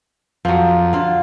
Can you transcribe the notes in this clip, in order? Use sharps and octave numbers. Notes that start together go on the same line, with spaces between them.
F2 F3 F#3
D3 F4